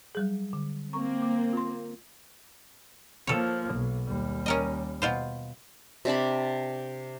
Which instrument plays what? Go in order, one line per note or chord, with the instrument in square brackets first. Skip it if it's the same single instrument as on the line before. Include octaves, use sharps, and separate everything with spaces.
[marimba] F#3 G3 G#4
D3
[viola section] A#3 C4 [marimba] A#5 C#6
[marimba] D6
F4 C6
[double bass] F3 A#3 [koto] A4 C#5
[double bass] B1
D#2 G3
[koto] C#4 A#4 D#5
B2 F4 C5
[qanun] C3 D4 A5 B5